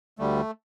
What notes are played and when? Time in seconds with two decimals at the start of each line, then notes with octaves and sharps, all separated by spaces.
0.19 D2 D3 G3 A3